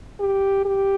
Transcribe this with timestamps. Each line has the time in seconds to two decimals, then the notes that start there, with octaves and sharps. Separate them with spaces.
0.20 G4
0.65 G4